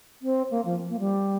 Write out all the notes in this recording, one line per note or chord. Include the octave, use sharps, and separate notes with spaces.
C4
A#3
F3
A#3
G3